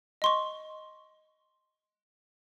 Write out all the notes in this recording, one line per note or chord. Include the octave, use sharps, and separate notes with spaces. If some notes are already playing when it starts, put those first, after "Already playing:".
D#5 C6 C#6